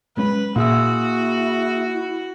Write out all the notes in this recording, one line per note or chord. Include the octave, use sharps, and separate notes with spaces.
F#3 G#3 C#4 B4
A#2 A#3 E4 F#4 G#4 E6